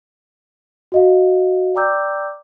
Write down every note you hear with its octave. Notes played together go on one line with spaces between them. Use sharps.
F#4 D#5 F5
D5 G5 A#5 D6 E6 G6